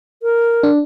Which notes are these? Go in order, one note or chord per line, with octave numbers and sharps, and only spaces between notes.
A#4
D4